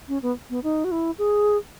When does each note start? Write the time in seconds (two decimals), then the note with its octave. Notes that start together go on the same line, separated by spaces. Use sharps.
0.08 C#4
0.22 B3
0.50 B3
0.63 D#4
0.84 F#4
0.91 E4
1.18 G#4